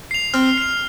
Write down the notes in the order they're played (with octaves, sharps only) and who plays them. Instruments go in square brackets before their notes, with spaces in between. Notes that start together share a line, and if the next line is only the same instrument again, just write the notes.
[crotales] C7 F7
[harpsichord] C4 [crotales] F6
[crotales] C7 F7